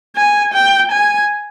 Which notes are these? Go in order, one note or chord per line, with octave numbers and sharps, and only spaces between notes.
G#5
G5
G#5